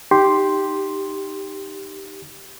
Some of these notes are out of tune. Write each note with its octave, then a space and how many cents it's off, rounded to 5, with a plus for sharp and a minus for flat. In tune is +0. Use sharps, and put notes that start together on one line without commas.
D#4 +0 G4 +0 C6 +0